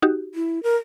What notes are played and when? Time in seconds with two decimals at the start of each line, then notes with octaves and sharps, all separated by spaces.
0.02 D#4 F#4 G4
0.35 E4
0.63 A#4